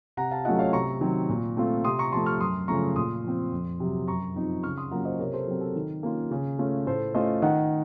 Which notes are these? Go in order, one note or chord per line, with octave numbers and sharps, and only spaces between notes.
C3 F#5 A#5
F5 A5
F#3 A3 C#4 F4 D#5 F#5
C#5 F5
C3 A#5 C#6
D#3 F#3 C4
A#2
A3 C4 F4
C3 C6 D#6
A#5 C#6
F3 A3 A5 C6
C#6 F6
F#2 C6 D#6
C#3 F3 A3 A#5 C#6
A#2 C6 D#6
F3 C4
F2
C3 F#3
F#2 A#5 C#6
F3 C4 D#4
C#3 C#6 F6
C6 D#6
F#3 A#3 C#4 F4 F#5 A#5
C5 D#5
C3 A#4 C#5
A4 C5
F#3 C4
A4
D#3
A#3 C#4 F4
C#3
A3 C#4 F4
A2 A4 C5
A3 C#4 F4 C5 D#5
D#3 D#5 F#5